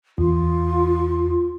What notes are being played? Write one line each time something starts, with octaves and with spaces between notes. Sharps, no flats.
E2 F4